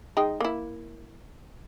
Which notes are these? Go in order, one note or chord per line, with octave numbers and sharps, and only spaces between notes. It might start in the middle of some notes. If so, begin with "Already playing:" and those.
G#3 D#4 G5
A#3 E4